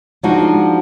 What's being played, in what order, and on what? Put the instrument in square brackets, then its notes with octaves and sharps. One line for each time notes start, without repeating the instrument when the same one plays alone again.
[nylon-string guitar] F3 G#3 D4 D#4 F#4